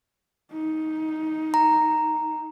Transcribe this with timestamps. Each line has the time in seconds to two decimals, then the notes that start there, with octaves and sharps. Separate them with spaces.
0.53 D#4
1.54 A#5